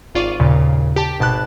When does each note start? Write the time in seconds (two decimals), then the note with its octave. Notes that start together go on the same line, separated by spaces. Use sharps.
0.15 G#1 F4 D5 C#6 D#7
0.40 G#1 D#2 A#2 C#3
0.96 G4 A5
1.19 G#1 B2 A5 F#6